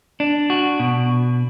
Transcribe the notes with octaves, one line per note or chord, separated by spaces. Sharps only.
D4
F#4
B2